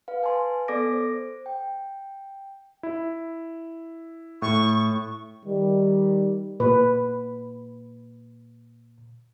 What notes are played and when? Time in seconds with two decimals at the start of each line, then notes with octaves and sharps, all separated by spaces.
0.08 B4 F5
0.23 B4 G#5 A5 C6
0.68 B3 A4 D5 D6 A#6 D7
0.93 C5
1.46 G5
2.83 E4
4.42 A2 C#6
5.46 D#3 G3
6.60 A#2 B4